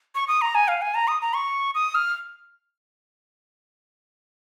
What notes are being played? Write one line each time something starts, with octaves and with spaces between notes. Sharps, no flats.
C#6
D#6
A#5
G#5
F5
G#5
A#5
D#6
A#5
C#6
D#6
F6